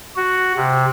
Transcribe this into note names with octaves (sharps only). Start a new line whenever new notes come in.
F#4
C3